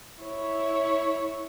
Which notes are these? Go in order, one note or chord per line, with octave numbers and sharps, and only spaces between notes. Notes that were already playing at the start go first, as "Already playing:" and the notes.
E4 C#5